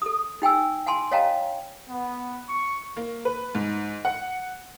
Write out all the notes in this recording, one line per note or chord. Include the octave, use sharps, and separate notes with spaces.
A4 D#6
D#4 G5 G#5 E6
F#5 G#5 A5 C6
C#5 D#5 F5 G5 A5 A#5
B3
C#6
A#3
B4
G#2
F#5